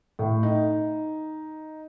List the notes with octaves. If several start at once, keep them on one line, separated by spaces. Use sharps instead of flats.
A2
D#4